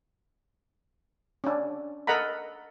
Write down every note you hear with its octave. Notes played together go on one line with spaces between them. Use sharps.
C#4 D4
A4 A#4 D#5 F#5 A#5 B5